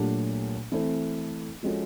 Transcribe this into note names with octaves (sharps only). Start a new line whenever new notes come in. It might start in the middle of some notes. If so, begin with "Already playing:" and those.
Already playing: A#2 F#3 A3 D4 G4
E3 A3 C4 E4 A4
F3 G#3 C#4 F#4 A4